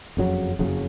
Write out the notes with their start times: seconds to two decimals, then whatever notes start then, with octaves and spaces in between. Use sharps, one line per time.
0.17 F#1 F2 C#3 F#3
0.59 F#1 F2 C#3 F#3